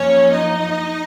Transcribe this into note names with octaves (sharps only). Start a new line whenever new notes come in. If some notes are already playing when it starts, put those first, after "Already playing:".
Already playing: F#2 F3 A#3 C#4 C#5
D#4 D#5